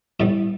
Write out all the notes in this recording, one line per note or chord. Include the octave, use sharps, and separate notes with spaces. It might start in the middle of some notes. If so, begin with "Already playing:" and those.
A2 G3 B3 E5